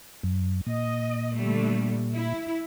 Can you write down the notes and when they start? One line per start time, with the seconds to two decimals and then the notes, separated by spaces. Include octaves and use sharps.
0.23 F#2
0.66 A#2 D#5
1.35 D3 G3 A3
2.13 E4